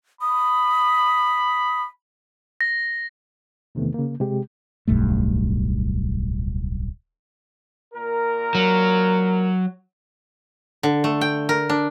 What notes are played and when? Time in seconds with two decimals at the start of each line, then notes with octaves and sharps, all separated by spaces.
0.21 B5 D#6
2.61 A#6
3.75 E2 C3 D#3 A3 B3
3.94 C#3 A#3
4.20 C3 G#3 G4
4.88 D1 B1 G2 A3
7.94 A#2 A#4
8.55 F#3
10.83 D3
11.04 A3
11.21 G5
11.49 A#4
11.70 D4